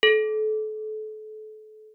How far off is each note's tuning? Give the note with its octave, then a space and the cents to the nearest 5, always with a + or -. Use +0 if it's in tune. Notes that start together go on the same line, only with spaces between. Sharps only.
A4 -35